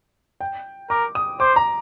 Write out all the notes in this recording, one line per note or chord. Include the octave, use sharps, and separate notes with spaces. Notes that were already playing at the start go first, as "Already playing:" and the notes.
G5
A#4 D6
D#6
C5 D6
A#5